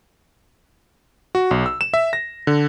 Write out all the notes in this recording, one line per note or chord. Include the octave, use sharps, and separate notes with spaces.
F#4
B1
E6
E7
E5
A#6
D3